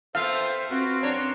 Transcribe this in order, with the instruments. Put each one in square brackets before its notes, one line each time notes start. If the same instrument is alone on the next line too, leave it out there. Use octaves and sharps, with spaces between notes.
[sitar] B3 C4 F4 [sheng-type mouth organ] A4 C5 E5 [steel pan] F5
[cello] C4 [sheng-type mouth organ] F4 F#4 [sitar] B4
[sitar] F#2 D4 C#5 [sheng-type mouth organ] A5 A#5 C6